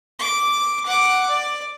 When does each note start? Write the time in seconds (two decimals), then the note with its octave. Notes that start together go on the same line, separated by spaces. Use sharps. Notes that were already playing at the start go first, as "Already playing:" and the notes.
0.19 D6
0.86 F#5 D6
1.28 D5